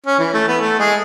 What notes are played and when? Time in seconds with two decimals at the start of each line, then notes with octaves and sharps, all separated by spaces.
0.06 C#4
0.19 E3
0.34 A3
0.48 B3
0.61 A3
0.79 G#3